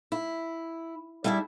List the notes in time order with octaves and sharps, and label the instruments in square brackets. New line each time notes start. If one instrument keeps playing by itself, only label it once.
[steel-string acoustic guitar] E4
G3 D4 E4 G#4 E5